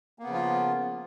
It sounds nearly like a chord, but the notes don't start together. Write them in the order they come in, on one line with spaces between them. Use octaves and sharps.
A#3 B3 C#3 F3 F4